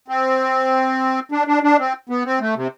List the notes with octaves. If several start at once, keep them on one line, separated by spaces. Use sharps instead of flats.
C4
D4
D4
D4
C4
B3
C4
A3
C3